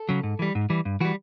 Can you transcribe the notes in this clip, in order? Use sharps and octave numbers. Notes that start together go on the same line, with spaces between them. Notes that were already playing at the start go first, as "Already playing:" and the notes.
Already playing: A4
C#3 F#3
G#2
E3 G3
G#2
E3 G3
G2
E3 G3 F#4